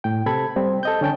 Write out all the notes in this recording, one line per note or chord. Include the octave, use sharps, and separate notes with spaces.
A2 G5
C3 A4 B5 G#6
G3 C4
A4 D#5 G6
D3 C#4 G5 A5